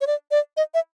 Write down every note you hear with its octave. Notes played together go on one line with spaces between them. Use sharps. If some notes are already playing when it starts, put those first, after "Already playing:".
C#5
D5
D5
D#5
E5